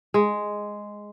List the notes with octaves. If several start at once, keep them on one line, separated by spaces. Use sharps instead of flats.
G#3